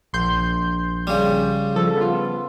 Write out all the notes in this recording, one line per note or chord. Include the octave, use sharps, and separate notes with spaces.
A#1 C6 G6
C#3 G3
F3 A4
B3 F4